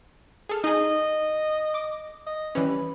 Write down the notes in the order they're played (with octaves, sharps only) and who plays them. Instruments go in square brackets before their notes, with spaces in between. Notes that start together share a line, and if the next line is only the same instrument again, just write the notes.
[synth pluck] G#4 A4 F6
[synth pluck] D#4 G#4 [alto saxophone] D#5
[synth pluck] D6
[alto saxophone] D#5
[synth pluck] E3 G3 C#4 [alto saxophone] B4